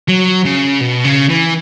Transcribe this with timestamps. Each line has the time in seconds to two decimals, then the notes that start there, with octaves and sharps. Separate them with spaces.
0.09 F#3
0.45 C#3
0.81 B2
1.04 C#3
1.29 E3